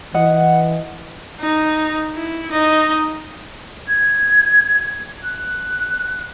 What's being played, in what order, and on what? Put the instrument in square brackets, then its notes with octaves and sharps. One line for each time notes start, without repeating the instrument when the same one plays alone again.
[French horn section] E3 [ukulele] D#5 [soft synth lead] F#5
[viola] D#4
E4
D#4 D#5
[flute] G#6
F#6